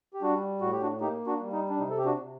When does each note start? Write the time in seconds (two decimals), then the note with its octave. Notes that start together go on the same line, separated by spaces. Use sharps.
0.14 G4
0.22 G3 D4 F#4
0.61 A2 F#4
0.72 G4
0.82 D4 F#4
1.01 A#3 D#4 G4
1.27 D4 F#4
1.40 G3
1.53 D#4
1.70 D4
1.79 C3 D#4
1.90 A4
1.98 G4
2.05 D4 F#4
2.18 C3